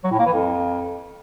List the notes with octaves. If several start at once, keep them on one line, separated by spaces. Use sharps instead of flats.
F#3
A2
A#3
E3
F2